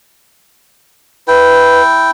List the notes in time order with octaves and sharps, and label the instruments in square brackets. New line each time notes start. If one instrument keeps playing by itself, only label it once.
[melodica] E4 G5 [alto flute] B4